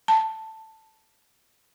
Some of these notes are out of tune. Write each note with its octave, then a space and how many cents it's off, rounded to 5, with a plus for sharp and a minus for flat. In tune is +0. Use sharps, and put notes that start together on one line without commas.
A5 +5